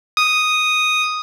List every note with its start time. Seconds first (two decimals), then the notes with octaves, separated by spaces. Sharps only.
0.17 D#6